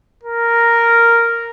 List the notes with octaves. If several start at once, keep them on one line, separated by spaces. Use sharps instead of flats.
A#4